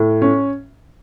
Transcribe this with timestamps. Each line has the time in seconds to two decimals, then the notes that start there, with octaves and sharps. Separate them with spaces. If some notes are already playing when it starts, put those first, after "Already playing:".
Already playing: A2
0.22 C#4